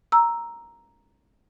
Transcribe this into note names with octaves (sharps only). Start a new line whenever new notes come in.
A#5 E6